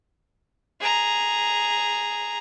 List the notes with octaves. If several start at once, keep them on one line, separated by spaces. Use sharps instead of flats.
G#4 A#5